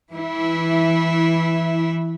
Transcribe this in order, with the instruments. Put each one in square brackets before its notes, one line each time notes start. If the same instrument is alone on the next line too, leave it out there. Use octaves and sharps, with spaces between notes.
[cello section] E3 E4